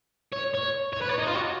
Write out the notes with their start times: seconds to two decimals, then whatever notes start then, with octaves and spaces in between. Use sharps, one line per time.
0.32 C#5
0.54 C#5
0.93 C#5
1.02 B4
1.09 C#5
1.19 D#4
1.27 F4
1.35 F#4